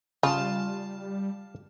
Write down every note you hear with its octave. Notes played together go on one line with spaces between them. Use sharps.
C#3 G3 F4 F5 A5